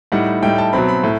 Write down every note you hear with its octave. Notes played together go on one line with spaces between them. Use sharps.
A2 G3 D#4 F#5
A2 G3 D#4 G5
A5
B2 F#3 C4 B5
B5
A2